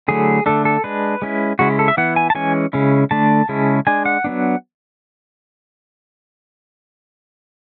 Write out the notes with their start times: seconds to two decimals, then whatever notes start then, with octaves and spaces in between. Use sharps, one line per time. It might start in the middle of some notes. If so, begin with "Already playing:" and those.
0.08 D3 F#3 A3 E4 G#4
0.46 D3 A3 D4 A4
0.65 A4
0.84 G#3 D4 B4
1.22 G#3 C#4 E4
1.59 C#3 G#3 C#4 E4 F#4
1.79 A4
1.88 E5
1.97 E3 B3 E4 F#5
2.16 G#5
2.30 A5
2.35 E3 G#3 C#4 G#5
2.73 C#3 G#3 C#4 E4
3.11 D3 A3 D4 A5
3.49 C#3 G#3 C#4 E4
3.87 G#3 D4 G#5
4.06 F#5
4.24 F#3 B3 D4